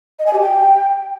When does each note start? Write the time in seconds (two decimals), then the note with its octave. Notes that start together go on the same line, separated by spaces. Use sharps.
0.19 D#5
0.26 G#5
0.33 G4
0.40 G5